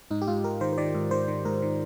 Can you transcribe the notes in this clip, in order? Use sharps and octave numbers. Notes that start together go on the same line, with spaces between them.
G#2 D#4
G4
G#2 F4
G#2 A#4
D#3 C5
C5
D#3 D5
G#2
D#3 C5
D#3
G#2 A#4
D#3